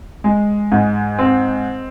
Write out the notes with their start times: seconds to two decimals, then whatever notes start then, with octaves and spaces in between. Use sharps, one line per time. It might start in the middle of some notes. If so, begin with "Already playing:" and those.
0.24 G#3
0.72 G#2
1.19 C4